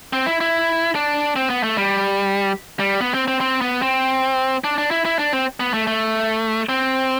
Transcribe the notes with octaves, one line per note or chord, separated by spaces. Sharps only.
C4
E4
E4
D4
C4
B3
A3
G3
G3
B3
C4
C4
C4
B3
C4
D4
D4
E4
E4
D4
C4
B3
A3
A3
C4